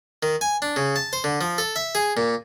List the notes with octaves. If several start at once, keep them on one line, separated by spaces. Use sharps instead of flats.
D#3
G#5
D4
C#3
A5
C5
D3
F3
A4
E5
G#4
A#2